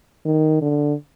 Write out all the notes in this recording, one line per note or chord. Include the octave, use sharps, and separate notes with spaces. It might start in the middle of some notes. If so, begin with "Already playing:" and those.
D#3
D3